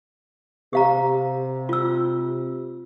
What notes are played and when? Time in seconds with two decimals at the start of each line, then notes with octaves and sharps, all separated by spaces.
0.73 C3 G4 F5 A#5
1.69 F4 E6